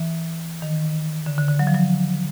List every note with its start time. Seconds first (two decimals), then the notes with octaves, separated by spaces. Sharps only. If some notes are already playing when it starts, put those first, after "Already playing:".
Already playing: E3
0.62 D#3
1.26 D3
1.38 D3
1.48 D3
1.59 F#3
1.67 F3
1.75 F#3